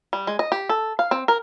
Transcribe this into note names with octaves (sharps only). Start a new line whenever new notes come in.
G3
G#3
D#5
G4
A4
F5
C4
A#4